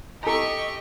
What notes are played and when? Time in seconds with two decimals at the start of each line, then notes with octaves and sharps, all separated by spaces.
0.23 G4 A4 D#5 A#5 C#6